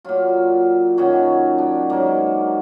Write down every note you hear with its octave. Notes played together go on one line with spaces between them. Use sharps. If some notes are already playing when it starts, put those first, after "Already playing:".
A#2 F#3 F4
F#2 D#3 F#3 F#4
D4
G#2 F#3 A#3